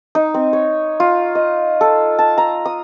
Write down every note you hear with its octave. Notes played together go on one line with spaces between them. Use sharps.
D#4
C4
C#5
F4
D#5
A4
A5
A#5
D#6